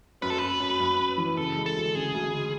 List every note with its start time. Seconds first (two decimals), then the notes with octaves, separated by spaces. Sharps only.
0.22 F#2 B4
0.30 A4
0.38 F#2 B4
0.60 F#2
0.80 F#2
0.99 F#2
1.18 E3
1.37 C#3 A4
1.57 G#3
1.66 A4
1.76 D2
1.95 C#3 G#4
2.14 D2
2.33 G#3